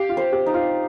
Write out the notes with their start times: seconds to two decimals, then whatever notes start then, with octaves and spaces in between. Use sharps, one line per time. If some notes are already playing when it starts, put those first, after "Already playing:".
Already playing: G4 F5
0.09 F4
0.17 C5
0.32 G4
0.46 D#4
0.54 F4